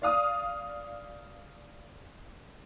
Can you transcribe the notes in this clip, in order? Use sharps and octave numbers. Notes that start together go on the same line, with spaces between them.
D5 F5 D#6